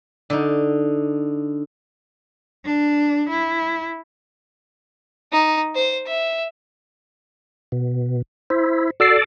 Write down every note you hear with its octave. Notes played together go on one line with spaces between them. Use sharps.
D3 D#4
D4
E4
D#4
C5
E5
B2
E4 C5
F#4 A4 D5 E6 C7